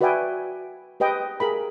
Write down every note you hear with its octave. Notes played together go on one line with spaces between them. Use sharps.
F#4 B4 D5 E5 G5 G#5
G4 B4 D#5 G5
G#4 A#4 B5